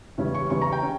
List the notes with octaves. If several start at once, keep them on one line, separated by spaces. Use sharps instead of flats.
E2 C#3 G3 C#4
C#6
E2 C#3 G3 C#4 C#6
A#5
G5
C#4